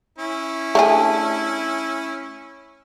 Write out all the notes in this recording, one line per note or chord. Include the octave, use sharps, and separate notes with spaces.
C#4 E4
A3 D4 G#4